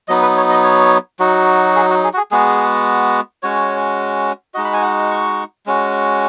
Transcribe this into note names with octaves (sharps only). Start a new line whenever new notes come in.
F#3 B3 D#4 D#5
B4
C#5
D#5
C#5
F#3 D#4 F#4
G#4
F#4
G#4
F#4
G#4
G#3 B3 F#4 G#4
G#3 C#4 F#4 C#5
G#3 D#4 F#4 D#5
B5
G#5
F#5
C#6
G#3 C#4 F#4